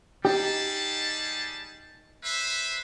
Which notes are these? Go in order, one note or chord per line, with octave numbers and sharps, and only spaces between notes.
G3 D#4 G4 G#4 A5
B4 C5 E5